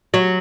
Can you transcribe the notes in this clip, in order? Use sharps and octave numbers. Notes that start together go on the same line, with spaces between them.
F#3